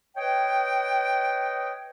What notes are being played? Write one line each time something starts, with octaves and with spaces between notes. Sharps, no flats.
B4 C#5 D#5 G5